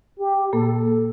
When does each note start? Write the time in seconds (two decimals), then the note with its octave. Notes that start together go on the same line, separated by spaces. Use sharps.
0.19 G4
0.53 A#2 A#3 A4